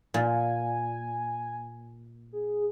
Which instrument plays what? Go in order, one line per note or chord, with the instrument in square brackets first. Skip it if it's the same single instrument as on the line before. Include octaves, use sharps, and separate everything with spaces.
[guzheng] A#2 [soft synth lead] G#5
[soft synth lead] G#4